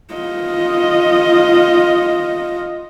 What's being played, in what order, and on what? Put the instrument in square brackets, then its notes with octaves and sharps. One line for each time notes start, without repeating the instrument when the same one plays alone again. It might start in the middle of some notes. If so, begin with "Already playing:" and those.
[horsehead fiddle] F4 D#5